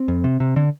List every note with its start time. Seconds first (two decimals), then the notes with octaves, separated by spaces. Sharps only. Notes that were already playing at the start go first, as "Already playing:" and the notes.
Already playing: C4
0.08 F2
0.24 C3
0.40 C3
0.56 D3